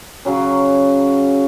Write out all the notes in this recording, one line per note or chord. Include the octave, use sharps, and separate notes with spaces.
C#3 F#3 C#4